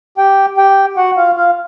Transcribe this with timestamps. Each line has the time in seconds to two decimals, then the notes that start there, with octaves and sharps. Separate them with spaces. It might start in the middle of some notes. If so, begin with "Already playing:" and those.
0.18 G4 G5
0.57 G4 G5
0.97 F#4 F#5
1.17 F4 F5
1.37 F4 F5